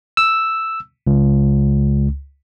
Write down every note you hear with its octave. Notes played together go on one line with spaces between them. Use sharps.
E6
C#2